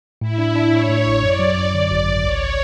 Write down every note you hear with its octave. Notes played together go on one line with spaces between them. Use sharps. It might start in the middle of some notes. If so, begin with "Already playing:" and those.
A2 E4
D4
D4
A2 C#5
A2
A1
F#2 D5
F#3
F#2
D3 D5
G#1
G#1
C#2 C#5